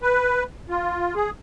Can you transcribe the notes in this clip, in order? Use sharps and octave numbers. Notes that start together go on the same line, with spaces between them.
B4
F4
G#4